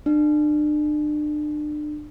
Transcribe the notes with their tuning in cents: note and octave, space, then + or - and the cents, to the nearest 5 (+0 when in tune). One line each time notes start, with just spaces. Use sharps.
D4 +35